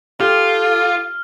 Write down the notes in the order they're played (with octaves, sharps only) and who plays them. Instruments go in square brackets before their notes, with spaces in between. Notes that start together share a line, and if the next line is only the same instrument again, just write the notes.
[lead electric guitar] F4 [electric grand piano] G4 [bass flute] A4 [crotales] F6